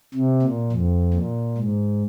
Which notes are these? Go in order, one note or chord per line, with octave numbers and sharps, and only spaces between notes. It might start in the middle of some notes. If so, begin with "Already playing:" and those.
C3
A#2
F2
A#2
G#2